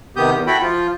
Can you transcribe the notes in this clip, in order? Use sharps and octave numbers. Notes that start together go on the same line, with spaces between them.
C3 D#3 B3 G4 D#6 G6
E2
E4 F#4 A4 G5 B5
F3 F4